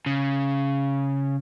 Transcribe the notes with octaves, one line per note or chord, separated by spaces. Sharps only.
C#3